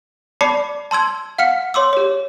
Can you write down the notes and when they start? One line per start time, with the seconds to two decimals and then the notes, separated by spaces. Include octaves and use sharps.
0.41 D5 A5 B5 D6 C7 C#7
0.91 A5 C6 E6 G#6
1.38 F5 F#5 F6 B6 C#7
1.74 C#5 C6 D6 E6
1.93 G4 C#5